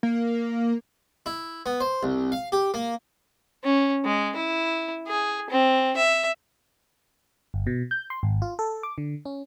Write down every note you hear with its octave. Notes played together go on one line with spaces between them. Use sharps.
A#3
E4
B3
C5
C2
F5
G4
A#3
C#4
G#3
E4
G#4
C4
E5
G1
B2
G6
C6
G#1
F4
A4
D6
D3
C#4